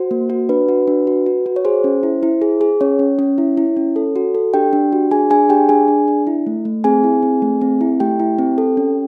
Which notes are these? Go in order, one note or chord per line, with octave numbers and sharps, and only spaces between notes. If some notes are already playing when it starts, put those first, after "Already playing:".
Already playing: F#4 C5
A#3
F#4
D4 B4
F#4
D4
F#4
F#4
F#4
C#5
G#4 C5
C#4
E4
E4
G#4
G#4
C#4 C#5
C#4
C#4
E4
E4
C#4
A4
F#4
A4
D4 G4 G5
D4
F#4
D4 G#4 G#5
D4 G#4 G#5
D4 G4 G5
D4 G#4 G#5
D4
D4
E4
A3
A3
C4 G#4 G#5
E4
C4
A3
C4
E4
A3 G4 G5
E4
C4
A4
C#4